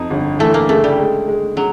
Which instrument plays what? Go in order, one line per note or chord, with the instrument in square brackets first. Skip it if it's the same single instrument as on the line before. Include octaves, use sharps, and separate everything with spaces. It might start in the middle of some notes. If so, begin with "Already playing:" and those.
Already playing: [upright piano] F2 [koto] D#4
[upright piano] G1
[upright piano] E3 [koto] A3
[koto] A#3
[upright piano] C#3 [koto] A3
[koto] G3
[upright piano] G#3
G#3
[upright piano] C#3 [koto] F#3